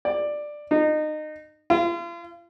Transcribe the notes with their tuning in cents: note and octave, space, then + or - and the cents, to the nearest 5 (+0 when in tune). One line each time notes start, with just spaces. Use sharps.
D5 +10
D#4 -25
F4 -40